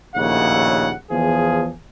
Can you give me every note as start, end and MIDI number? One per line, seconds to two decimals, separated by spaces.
0.16 0.91 34
0.16 0.91 39
0.16 0.91 45
0.16 0.91 49
0.16 0.91 78
1.10 1.69 40
1.10 1.69 53
1.10 1.69 68